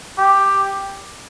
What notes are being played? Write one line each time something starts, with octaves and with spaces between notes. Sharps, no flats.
G4